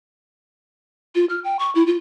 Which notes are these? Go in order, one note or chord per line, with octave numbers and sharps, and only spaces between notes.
F4
F6
G5
C#6
E4
F4